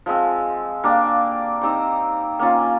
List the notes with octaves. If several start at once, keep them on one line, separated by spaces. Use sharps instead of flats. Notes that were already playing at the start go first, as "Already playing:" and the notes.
F3 G#3 C4
A#3 D4 G4
C4 D#4 G4 C5
A#3 C#4 F4